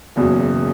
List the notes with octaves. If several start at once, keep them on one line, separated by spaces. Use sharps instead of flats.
F#1 E2 B2 F#3